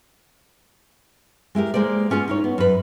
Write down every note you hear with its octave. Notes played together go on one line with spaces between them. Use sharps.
G#3 E4 G4 A#4
G#3 A#3 C5 D5
B3 C#4 F4 G4 G#4
D#4 E4 C#5
B3
F#2 B4